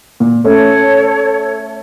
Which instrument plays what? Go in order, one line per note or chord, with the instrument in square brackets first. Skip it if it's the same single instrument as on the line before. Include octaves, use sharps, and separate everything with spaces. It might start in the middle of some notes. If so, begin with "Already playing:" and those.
[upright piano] A#2
[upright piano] A3 C#4 [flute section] A4 C#5